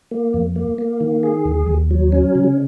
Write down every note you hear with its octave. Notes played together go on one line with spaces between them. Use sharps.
A#3
F2
A#3
A#3
D#3
G#4
D#2
D#2
F#3
C#4
C#3